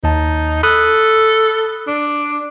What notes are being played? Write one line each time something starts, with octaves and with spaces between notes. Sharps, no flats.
D#2 D#4 A5
A4 B5 D#6 F#6
D4